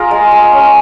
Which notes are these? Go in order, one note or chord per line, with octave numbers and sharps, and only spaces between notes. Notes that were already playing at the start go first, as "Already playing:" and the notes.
Already playing: F4 G#4 A#4
G#3
G#3
C#4